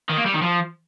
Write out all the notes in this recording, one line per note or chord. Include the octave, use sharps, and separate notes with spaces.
D#3
A#3
G3
D#3
F3